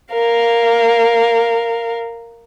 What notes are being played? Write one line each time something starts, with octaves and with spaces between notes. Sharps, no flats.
A#4 F5